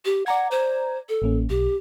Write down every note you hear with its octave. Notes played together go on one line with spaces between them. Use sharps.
G4
D5 F#5 A#5 G#6
C5
A4
A1 A#3 C#4
B1 G4